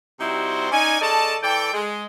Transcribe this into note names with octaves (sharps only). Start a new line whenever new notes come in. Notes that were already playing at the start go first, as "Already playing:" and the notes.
C3 G3 D#4 E4 F#4 C5
C#4 D#4 D5 G#5
C#3 A4 D5 D#5 A5
E3 A4 D5 G5
G#3